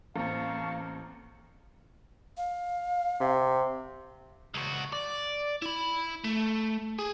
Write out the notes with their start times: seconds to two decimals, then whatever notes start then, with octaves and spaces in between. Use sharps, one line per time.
0.16 A1 A#3 C4 F5 A5 A#5 C#6
2.37 F5
3.21 C3
4.54 C#2 F#4
4.92 D5
5.62 E4 B5
6.24 A3
6.99 G#4